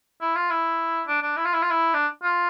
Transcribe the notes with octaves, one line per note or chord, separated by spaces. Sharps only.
E4
F4
E4
D4
D4
E4
F4
E4
F4
E4
D4
F4